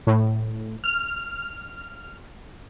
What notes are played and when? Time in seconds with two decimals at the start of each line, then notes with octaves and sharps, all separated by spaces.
0.07 A2
0.84 F6